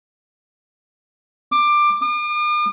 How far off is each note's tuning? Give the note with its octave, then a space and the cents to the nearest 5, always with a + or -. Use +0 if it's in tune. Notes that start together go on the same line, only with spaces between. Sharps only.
D6 +15
D6 +45